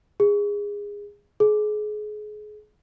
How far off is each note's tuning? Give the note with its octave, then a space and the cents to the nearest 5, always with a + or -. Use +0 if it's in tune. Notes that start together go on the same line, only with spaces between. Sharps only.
G#4 -20
G#4 +30